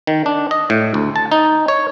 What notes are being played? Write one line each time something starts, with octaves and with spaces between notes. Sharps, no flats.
D#3
D4
D#5
A2
D2
A5
D#4
C#5